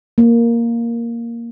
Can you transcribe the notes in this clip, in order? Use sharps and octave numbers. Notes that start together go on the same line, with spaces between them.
A#3